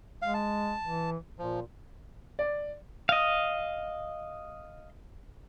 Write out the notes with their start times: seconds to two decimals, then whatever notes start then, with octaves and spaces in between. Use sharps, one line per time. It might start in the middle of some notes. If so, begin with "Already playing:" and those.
0.22 G#3 F5
0.34 A5
0.82 E3
1.39 A#2 F3
2.39 D5
3.09 D#5 F5